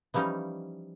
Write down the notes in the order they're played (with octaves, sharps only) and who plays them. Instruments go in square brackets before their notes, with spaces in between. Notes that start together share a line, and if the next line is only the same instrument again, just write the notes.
[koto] E3 F3 G3 C#4 D#4